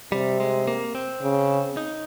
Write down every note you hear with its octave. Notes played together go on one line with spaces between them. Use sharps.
C3 G3
G#3
A#3
C4
C#3
D#4